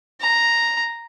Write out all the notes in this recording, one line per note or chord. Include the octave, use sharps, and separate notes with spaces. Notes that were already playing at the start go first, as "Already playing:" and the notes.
A#5